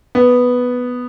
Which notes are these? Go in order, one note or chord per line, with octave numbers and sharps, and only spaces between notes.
B3